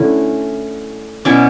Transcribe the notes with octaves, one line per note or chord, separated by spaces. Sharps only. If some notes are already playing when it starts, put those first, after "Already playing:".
Already playing: D3 A3 C#4 E4
B2 F#3 C#4 E4 D5